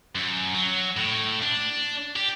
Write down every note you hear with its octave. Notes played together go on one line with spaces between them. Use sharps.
F#2
F#3
A2
D4
G4